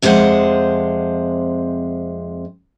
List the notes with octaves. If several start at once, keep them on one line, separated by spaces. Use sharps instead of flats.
F2 C3 G#3 C#4 C5 F#5